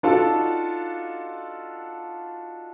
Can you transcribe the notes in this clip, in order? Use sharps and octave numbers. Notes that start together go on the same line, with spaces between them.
D4 D#4 F4 F#4 A4